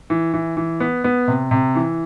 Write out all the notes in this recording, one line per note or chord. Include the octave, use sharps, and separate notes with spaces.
E3
E3
E3
B3
B3
C3
C3
E3